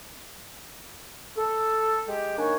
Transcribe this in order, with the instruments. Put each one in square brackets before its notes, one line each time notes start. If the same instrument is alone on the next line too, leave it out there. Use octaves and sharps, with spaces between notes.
[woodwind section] A4
G#3 G4
D#3 A#3 D4 D#4 C#5 G#5